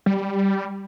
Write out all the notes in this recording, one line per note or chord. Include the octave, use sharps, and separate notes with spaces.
G3